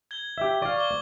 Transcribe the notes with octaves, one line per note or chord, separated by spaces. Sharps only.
G#6 G7
G4 E5
D5 F5 C#6
D6 G7